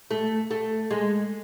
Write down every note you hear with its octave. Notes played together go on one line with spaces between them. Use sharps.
A3
A3
G#3